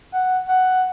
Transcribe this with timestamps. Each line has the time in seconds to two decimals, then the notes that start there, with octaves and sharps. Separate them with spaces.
0.13 F#5
0.48 F#5